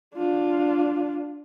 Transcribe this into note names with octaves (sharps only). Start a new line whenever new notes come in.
D4 F4